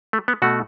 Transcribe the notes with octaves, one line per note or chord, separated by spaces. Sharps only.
A3
B3
B2 A3 F#4